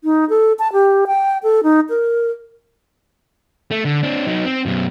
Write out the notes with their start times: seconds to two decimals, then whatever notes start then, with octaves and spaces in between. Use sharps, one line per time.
0.04 D#4
0.29 A4
0.59 A5
0.73 G4
1.07 G5
1.43 A4
1.63 D#4
1.90 A#4
3.71 A3
3.85 D3
4.03 C4 D4
4.27 F#3 D#4
4.45 C4
4.66 F#2 B2